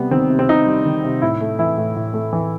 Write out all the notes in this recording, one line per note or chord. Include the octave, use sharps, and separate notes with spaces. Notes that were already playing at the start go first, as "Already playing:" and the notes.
Already playing: C3 G3 B3
D#3 C4
C3
C4
C3 D#4
G3
D#3
C3
A2 E4
A3
E3 E4
A2
A2
A3
E3